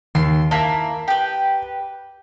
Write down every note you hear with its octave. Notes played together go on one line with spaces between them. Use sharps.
D#2 C6
A#3 E4 A5
G4 B4